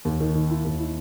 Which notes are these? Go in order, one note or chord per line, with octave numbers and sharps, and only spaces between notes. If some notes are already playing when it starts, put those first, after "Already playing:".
D#2
D#3
D#3
E4
D#2
E4